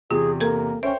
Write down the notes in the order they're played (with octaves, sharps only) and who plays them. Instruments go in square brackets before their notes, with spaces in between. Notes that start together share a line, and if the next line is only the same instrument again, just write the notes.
[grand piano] E2 C3 [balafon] F4 [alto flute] G#4
[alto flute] A#3 [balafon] A4 A#4
[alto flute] C#4 [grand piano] C5 C#5 G5 [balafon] E5